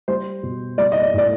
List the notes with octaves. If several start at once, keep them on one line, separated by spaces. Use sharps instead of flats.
G3 C5
B2
G3 D5
D#5
D5
A2 D5